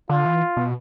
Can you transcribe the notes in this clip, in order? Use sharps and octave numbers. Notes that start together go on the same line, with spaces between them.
D3 F4
E3
B2